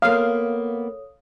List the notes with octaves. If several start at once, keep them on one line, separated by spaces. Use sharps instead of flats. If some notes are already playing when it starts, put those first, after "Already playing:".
A#3 B3 A4 C#5 F5 D#6